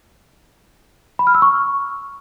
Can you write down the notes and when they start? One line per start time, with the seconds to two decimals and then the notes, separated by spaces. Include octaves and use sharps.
1.19 B5
1.27 F6
1.35 E6
1.42 C#6